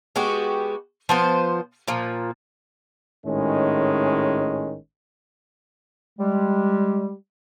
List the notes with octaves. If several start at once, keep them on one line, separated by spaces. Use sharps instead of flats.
G#3 B3 F#4 G4
F3 B3 C5
A#2 F3
G#1 A2 D#3 G#3 C#4
G3 G#3